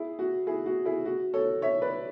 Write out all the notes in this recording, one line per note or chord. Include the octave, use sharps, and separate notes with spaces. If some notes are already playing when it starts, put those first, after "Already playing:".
Already playing: E4 G#4
F#4
E4 G#4
F#4
E4 G#4
F#4
A4 C#5
C#5 E5
B4 D5